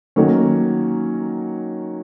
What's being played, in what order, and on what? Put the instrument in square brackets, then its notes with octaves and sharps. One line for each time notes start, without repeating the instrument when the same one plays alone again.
[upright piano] D#3 F#3 A#3 C#4